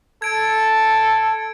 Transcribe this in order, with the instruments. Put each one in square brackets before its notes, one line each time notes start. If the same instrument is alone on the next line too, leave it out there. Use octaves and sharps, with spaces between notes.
[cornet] A4 [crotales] G#6 D7